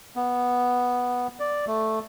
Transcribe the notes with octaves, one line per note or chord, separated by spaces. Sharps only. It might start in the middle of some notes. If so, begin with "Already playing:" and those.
B3
D5
A3